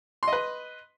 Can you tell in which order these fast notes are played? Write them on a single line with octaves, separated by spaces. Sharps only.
C6 D#5 B4